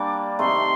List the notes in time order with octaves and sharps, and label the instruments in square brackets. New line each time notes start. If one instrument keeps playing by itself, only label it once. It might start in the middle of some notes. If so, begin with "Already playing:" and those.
Already playing: [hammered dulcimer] G3 A#3 D4 [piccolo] D6
[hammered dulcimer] C3 D#3 A3 [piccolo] C6